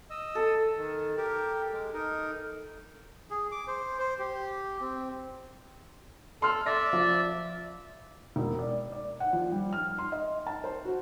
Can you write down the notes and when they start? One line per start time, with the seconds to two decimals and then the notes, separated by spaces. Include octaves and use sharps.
0.10 D#5 E6
0.35 A4
0.77 D#3
1.17 G4 A#4
1.73 G#3
1.93 D#4 A#4
3.30 G#4
3.52 D6
3.68 C5
3.99 C5
4.19 G4
4.81 C4
6.42 A4 C6 F6
6.66 D5 E5 A#6
6.93 F3
8.36 E1
8.59 D5
8.92 D5
9.20 F#5
9.33 F3
9.52 G3
9.73 F6
9.99 C6
10.12 D#5
10.47 A5
10.64 C5
10.85 F#4